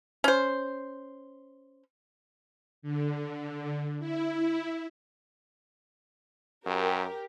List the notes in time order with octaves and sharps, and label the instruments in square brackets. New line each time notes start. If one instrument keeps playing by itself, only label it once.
[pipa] C#4 C5
[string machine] D3
E4
[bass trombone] F#2 [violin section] G4 A#4